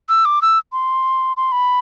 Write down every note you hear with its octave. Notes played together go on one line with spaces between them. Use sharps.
E6
D6
E6
C6
C6
B5